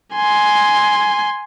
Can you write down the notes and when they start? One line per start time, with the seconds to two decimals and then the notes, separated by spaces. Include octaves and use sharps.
0.13 G#5 C6